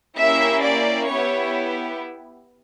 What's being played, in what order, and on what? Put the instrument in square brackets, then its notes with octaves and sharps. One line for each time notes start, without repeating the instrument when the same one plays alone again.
[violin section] A#3 C#4 E4 G4 E5
D5
B3 E4 G4 C#5